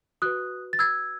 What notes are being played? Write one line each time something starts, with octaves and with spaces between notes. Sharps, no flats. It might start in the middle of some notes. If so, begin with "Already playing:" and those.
F#4 B4 D#6 F#6
A6
E6 G#6